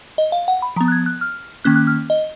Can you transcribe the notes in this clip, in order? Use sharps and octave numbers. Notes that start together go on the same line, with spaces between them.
D#5
F5
F#5
B5
F3 B3 A#5
F#6
G#6
F#6
F6
D#3 A#3 C#4 F#6
F#6
F6
D#5